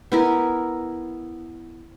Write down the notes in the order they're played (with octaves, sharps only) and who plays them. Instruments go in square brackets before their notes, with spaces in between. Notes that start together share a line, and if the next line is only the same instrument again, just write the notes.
[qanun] B3 E4 A#4